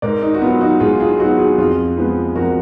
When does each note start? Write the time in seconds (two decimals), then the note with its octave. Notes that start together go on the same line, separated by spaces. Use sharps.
0.02 G#2 A#4 D5
0.22 D#4
0.34 F#4
0.42 F#3 B3 F4
0.61 D#4 F#4
0.80 G#2 F4 G#4
1.00 F4 G#4
1.19 F#3 B3 D#4 F#4
1.39 F4 G#4
1.58 F2 F4 G#4
1.97 F3 G#3 B3
2.36 F2 F#4 A#4